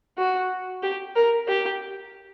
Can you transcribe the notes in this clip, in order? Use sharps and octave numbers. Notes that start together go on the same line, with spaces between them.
F#4
G4
A#4
G4